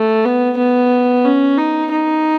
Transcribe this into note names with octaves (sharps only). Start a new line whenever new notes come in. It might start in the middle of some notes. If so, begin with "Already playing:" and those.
Already playing: A3
B3
B3
C#4
D#4
D#4